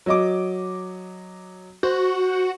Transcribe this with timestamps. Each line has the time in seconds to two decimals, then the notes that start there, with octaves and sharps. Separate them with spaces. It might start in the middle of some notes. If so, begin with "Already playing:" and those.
0.06 F#3 D#5 D6
1.83 F#4 C5